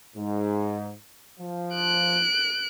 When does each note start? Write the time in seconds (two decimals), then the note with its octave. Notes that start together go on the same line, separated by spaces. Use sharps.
0.16 G#2
1.39 F3
1.75 F#6 D7